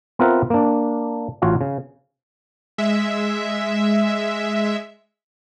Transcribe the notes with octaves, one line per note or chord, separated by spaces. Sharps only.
B3 C4 F4 A#4 E5 F#5
A#3 D4
A1 F4 F#4 C#5 F5
C#3
G#3 E5